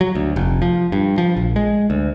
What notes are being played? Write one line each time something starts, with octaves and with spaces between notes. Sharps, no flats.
F#3
D2
F1
F3
G2
F3
A#1
G#3
D2